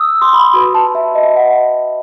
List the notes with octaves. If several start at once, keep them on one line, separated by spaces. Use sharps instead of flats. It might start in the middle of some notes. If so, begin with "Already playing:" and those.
Already playing: D#6 E6
C6
B5
F#4 B4 B5
A5
E5
D#5
F#5